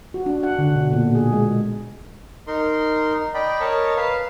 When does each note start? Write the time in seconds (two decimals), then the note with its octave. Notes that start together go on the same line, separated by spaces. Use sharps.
0.14 F#4
0.26 D4
0.43 F#5
0.59 D3
0.76 B2
0.93 A#2
1.15 G#4
1.33 G#3
2.48 D#4 A#4 C6
3.34 D5 D#5 G5 B5
3.60 A#4 C#5 D#5 A5
3.97 B4 F5 A5